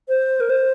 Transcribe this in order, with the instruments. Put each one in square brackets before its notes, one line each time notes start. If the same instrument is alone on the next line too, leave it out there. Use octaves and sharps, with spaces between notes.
[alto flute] C5
A#4
C5